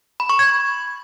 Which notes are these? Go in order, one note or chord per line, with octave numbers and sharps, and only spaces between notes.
B5
C#6
G#6